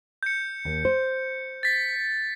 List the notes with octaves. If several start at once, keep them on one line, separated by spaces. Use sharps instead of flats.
G6 C#7
D#2
C5
A6 B6